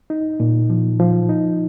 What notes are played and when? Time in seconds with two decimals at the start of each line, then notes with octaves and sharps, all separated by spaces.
0.10 D#4
0.40 A#2
0.70 F3
1.00 F3
1.29 D#4